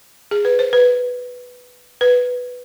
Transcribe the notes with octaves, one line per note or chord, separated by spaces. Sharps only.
G#4
B4
C5
B4
B4